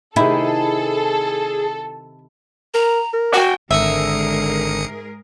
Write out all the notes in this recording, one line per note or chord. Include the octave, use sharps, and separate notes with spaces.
C3 D#3 E4 G#4 A4
A#4 A#5
A#4
F#4 F#5 G5
G#1 G#2 D3 G#4 A#4 E5 D#6 C#7